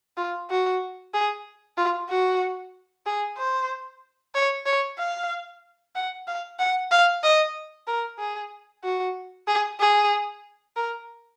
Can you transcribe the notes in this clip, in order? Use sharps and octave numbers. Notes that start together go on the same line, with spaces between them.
F4
F#4
G#4
F4
F#4
G#4
C5
C#5
C#5
F5
F#5
F5
F#5
F5
D#5
A#4
G#4
F#4
G#4
G#4
A#4